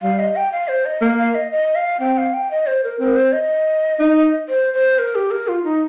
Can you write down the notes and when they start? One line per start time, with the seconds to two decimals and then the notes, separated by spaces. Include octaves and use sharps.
0.02 G3 F5
0.19 D#5
0.36 G5
0.52 F5
0.68 C5
0.86 D#5
1.01 A#3 F5
1.18 F5
1.35 D#5
1.52 D#5
1.75 F5
2.00 C4 G5
2.18 F5
2.34 G5
2.51 D#5
2.67 C5
2.84 A#4
3.00 C4 A#4
3.16 C5
3.33 D#5
3.99 D#4
4.49 C5
4.74 C5
4.99 A#4
5.15 G4
5.31 A#4
5.48 F4
5.64 D#4